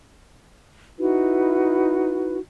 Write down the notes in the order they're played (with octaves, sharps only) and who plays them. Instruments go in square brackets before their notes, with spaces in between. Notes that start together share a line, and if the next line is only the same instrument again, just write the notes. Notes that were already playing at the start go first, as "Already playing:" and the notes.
[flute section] D#4 E4 F#4 B4